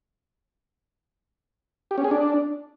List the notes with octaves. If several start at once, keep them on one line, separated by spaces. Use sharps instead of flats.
G4
C#4
G#4
D4